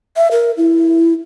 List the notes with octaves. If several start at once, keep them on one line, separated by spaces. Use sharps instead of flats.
E5
A#4
E4